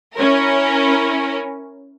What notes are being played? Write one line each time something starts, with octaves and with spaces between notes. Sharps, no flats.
C#4 E4 A#4